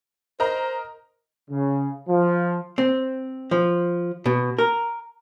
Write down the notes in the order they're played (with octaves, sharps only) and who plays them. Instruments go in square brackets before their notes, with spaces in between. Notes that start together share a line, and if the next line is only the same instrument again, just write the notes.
[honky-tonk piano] A#4 D#5 A#5 [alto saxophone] C5
[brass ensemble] C#3
F3
[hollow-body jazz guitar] C4
F3
B2
A#4